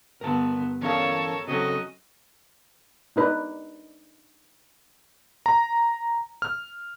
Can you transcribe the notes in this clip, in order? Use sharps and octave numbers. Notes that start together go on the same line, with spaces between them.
G2 D3 B3 A#4 A5
E3 C#4 A4 A#4 C#5 F5 A5
C#3 F#3 C4 C#4 F#4 A4 D#5
D4 D#4 B4 D5
A#5
F6